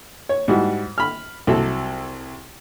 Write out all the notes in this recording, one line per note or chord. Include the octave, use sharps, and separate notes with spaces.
C#5
G#2 G3 E4 F#4
B5 F6
C2 C3 F#3 A4 E6